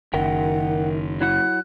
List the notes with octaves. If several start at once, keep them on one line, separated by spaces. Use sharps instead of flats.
F#1 D#3 A#4 E5 F#5 G5
F#3 E4 F#5 F#6